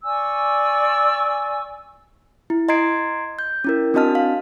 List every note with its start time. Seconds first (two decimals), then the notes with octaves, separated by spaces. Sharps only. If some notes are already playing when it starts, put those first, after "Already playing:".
0.05 D5 G#5 C#6 E6
2.50 E4
2.69 D#5 A#5 C6 G#6 C7 D7
3.39 G6
3.64 C#4 E4 A#4
3.94 C4 D4 F#4 D#5 A5 F6
4.15 F5